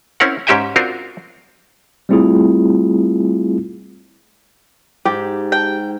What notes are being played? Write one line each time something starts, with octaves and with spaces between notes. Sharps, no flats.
C4 C#4 E4 A#4 F#5
G#2 C#4 G4 E5 G5 G#5
C4 D4 F4 F#4 A#4
G3 A3 C4 E4 F4 G#4
G#2 G4
G5